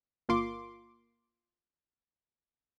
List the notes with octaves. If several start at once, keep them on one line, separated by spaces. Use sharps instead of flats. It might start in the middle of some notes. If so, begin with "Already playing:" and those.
G1 A#3 F4 C6 D6